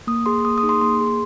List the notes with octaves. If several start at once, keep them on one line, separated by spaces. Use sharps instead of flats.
A#3 D#6
G#4 C6
A#3 D#6
D#6
D#4 G#4
C6
A#3 C6
G#4